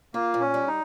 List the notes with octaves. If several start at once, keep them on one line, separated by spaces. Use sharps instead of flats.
A#3 F4
A#2
C#4
G3
D#4